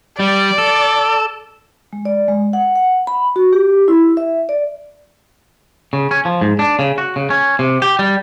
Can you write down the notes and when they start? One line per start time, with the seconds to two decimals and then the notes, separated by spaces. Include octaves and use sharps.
0.20 G3 D5
0.58 A4
1.93 G#3
2.05 D5
2.28 G#3
2.53 F#5
2.76 F#5
3.07 B5
3.36 F#4
3.53 G4
3.88 E4
4.17 E5
4.49 D5
5.93 C#3
6.11 C#4
6.25 F3
6.41 G#2
6.59 D4
6.79 C#3
6.98 F#4
7.16 C#3
7.30 C#4
7.59 C3
7.82 G4
7.99 G3